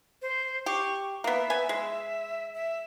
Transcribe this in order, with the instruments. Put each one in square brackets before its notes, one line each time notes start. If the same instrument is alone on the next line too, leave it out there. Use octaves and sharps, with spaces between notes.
[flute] C5
[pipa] G4 [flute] C#6
[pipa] A#3 B3 [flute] E5
[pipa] B3 G#5
G#3
[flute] E5